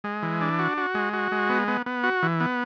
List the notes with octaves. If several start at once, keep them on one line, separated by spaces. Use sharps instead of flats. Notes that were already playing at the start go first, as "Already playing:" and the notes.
G#3
E3
D4
F#4
F#4
G#3
F#4
G#3
B3
B3
B3
F#4
E3
B3